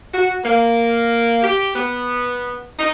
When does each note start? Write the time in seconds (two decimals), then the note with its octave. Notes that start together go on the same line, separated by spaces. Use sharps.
0.14 F#4
0.43 A#3
1.42 G4
1.75 B3
2.79 D#4